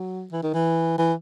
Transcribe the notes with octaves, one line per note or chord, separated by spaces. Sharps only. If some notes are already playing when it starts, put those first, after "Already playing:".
Already playing: F#3
E3
D#3
E3
E3